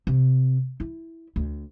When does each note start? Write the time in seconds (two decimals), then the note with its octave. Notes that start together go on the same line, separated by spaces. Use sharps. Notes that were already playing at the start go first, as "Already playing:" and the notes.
0.07 C3
0.80 E4
1.36 D2